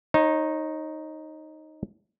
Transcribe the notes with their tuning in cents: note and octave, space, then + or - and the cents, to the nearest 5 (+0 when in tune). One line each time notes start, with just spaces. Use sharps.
D#4 +0 C#5 -30